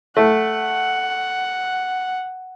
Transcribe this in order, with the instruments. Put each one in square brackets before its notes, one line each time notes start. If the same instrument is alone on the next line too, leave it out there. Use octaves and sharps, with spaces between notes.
[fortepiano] A3 [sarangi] F#5